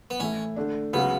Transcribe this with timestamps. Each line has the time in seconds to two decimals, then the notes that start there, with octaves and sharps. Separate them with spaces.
0.10 B3
0.20 A2 E3 A3 C#4 E4
0.56 D3 A3 D4
0.93 C#2 C#3 F#3 B3